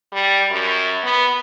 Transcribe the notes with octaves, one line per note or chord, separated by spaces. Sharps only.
G3
F#2
B3